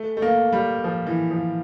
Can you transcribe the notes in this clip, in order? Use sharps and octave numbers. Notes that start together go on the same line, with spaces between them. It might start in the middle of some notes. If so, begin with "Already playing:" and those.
Already playing: A3
A3
A#3
G3
F3
E3
F3